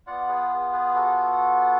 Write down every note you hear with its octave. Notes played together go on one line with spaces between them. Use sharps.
B3 F4 D5 F#5
G#4 B4
G#4 B4
F#4 A4